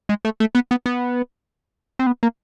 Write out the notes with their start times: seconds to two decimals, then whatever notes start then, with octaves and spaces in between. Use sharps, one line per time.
0.09 G#3
0.25 A3
0.40 A3
0.55 B3
0.71 B3
0.86 B3
1.99 C4
2.07 B3
2.23 A#3